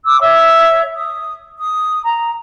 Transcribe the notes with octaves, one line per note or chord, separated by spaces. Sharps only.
D6 E6
C#5 E5 E6
D#6
D#6
A#5